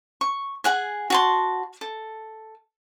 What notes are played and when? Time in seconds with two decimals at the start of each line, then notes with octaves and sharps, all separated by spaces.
0.21 C#6
0.64 G#4 F#5 G#5
1.10 F#4 A5 C6
1.81 A4